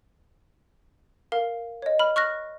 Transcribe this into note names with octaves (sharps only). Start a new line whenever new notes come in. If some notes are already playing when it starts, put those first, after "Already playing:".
A#4 F5
C#5 D#5
B5 F6
C#6 F6 F#6 A#6